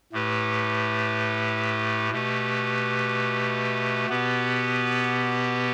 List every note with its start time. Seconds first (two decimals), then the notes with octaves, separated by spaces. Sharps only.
0.12 A2 A3 G4 B4
2.11 B2 A3 G4 B4
4.09 B2 B3 G4 B4